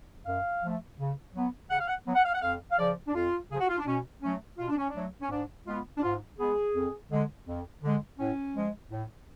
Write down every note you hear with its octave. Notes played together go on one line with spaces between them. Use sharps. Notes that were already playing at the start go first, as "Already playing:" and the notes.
F#2 F5
F3 A3
C#3
F#3 B3
C#3 F#5
F5
F#5
F#3 B3
F#5
F5
F#5
F2 F5
F5
C#3 F3 D5
D4
F2 F4
C#3 F3 G#4
F#4
F4
D4
B2 C#4
F#3 A3 C#4
B2 F4
D4
C#4
D4
F#3 A3
C#4
G#2 D4
G#3 B3 F4
D4
G#2 F4
G#3 B3 G#4
F2
D3 G#3
F2
D3 G#3
A2 C#4
F3 G#3
A2